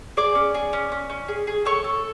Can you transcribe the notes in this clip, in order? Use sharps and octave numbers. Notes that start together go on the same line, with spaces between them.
G#4 D5 D6
C#4
G#4
C#4
C#4
C#4
G#4
G#4
A4 C#5 C#6
A4